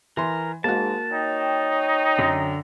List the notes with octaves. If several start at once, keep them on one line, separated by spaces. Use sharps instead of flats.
E3 A#4 C6
G#2 A#3 F#4 A5
D#4 C#5 G5
F#2 D3 A#5